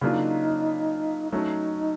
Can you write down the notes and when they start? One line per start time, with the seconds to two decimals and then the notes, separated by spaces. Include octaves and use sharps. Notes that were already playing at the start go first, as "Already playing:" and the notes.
0.01 C#3 F#3 A#3 D4 D#4 F4
1.32 F#3 A3 C#4 D#4